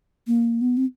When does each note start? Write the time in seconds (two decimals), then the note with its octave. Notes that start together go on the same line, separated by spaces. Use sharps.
0.27 A#3
0.61 B3
0.77 C4